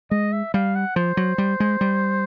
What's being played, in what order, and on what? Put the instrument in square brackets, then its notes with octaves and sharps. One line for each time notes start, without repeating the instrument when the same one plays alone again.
[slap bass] G#3 [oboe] D#5
[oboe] E5
[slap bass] G3 [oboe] F5
[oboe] F#5
[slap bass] F3 [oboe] C5
[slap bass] F#3
G3
G#3
G3